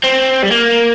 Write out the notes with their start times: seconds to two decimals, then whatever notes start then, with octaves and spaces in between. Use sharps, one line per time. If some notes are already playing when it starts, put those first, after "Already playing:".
0.04 C4
0.43 G3
0.51 A#3